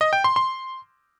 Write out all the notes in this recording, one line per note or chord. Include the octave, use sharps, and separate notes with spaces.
D#5
G5
C6
C6